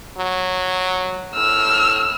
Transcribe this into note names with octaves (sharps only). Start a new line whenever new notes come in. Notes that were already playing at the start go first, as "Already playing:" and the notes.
F#3
A2 E6 F6